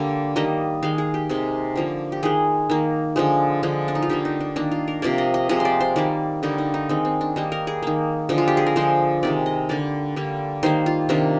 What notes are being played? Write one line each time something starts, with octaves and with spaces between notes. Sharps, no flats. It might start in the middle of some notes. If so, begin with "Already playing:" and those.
Already playing: D3 G3 A#3
D#3 G3 A#3 D#5
D#3 G#3 F5
G#4
G4
C3 D#3 G#3
D3 F3 A#3
G4
D#3 G#3 G#4
D#3 A#3
D3 F3 G#3
D3 F3 G#3
D4
D#4
F4
D3 G3 A#3 G4
D#4
D4
D#3 A#3 D4
F4
A#4
C3 F3 A#3 D5
D#5
D#5
C3 F3 G#3 D#5
C5
D5
C5
D#3 G3 A#3 D5
D3 G3 A#3 D#4
D#4
D#4
D#3 G#3 C4
C4
D4
D#3 G3 A#3 D#4
A#4
G#4
D#3 A#3
D3 F3 G#3
F4
G4
G#4
A#4
D3 F3 G#3 C5
C3 D#3 G#3 D5
D#5
D3 G3 A#3 D5
D3 G3 A#3
D#3 G3 A#3 C5
F4
C3 D#3 A#3 D4